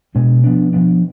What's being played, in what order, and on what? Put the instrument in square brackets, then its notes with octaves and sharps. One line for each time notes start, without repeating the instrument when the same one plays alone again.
[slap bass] B2 G#3 B3 D4
F3 B3 D4
F3 B3 D4